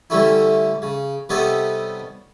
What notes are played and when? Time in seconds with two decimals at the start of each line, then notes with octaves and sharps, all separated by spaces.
0.10 D3 E3 G3 A3 C#4 E4
0.82 C#3
1.29 C3 G3 B3 D#4 A4 C#5